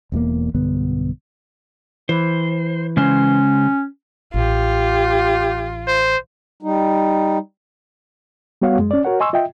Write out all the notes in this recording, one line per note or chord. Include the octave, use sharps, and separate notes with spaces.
E1 E2 G3 A#3
B1 G2 D3 B3
E3 C5
C#3 G#3 C#4 C5
A1 F4 G4
C5
G3 D#4
G3 B3 F#4 C#5 F5 F#5
F#2 G#3
C#4 D5
F#4 A#4 C#5 F#5
D#5 G#5 C6 C#6 E6
F4 D#5 E5 G5